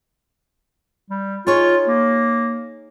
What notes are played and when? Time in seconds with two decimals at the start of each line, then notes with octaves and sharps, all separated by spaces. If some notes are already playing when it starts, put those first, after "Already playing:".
1.10 G3
1.47 D#4 F4 G#4 C#5
1.87 A#3